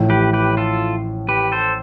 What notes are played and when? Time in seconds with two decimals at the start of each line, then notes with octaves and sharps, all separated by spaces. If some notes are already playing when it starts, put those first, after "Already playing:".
Already playing: A1 A2 F3
0.10 G4 B4
0.33 G4 B4
0.57 F4 A4
1.29 G4 B4
1.52 A4 C5